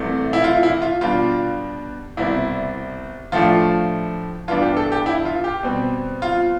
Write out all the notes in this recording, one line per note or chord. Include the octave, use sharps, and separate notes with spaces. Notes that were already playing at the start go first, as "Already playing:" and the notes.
Already playing: C2 C3 E3 A3
E4
F4
E4
F4
B2 G3 D4 F4
C2 B2 G3 C4 E4
A2 F3 A3 D4 F4
G2 E3 B3 D4 F4
G4
A4
G4
E4
F4
G4
B2 G3 C4
F4